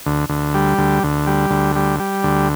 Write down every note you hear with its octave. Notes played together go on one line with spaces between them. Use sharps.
D2
D2
G3
D2
D2
G3
D2
G3
G3
D2